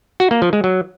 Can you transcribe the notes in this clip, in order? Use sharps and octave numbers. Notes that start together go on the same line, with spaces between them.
F#4
A#3
F3
G#3
F#3